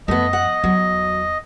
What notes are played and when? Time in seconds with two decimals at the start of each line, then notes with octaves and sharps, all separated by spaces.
0.08 F#2 F3 A3 B3 D#5
0.33 F#5
0.64 E2 F#3